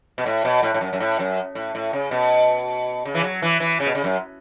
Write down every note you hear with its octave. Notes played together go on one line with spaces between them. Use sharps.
B2
A2
B2
A2
A2
F#2
F#2
A2
F#2
A2
A2
C#3
B2
C#3
E3
F#3
E3
E3
C#3
B2
C#3
F#2